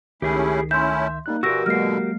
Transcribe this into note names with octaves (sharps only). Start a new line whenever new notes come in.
C#2 D#3 A3 C#4 E4 G4 G#4
A3 C#4 E4 E5 C6 G6
G3 A#3 D#4 F#6
A#2 E3 F#4 G4 A#4 C#6 E6 A#6
B2 D3 F#3 G#3 A#3 F6 C7